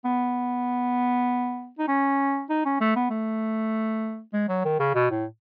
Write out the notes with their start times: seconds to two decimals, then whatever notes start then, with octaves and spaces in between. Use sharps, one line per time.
0.05 B3
1.79 D#4
1.88 C#4
2.50 D#4
2.65 C#4
2.81 A3
2.96 B3
3.11 A3
4.33 G#3
4.49 F#3
4.65 D#3
4.79 C#3
4.95 B2
5.11 A2